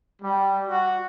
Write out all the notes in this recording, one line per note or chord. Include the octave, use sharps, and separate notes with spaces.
G3
F#4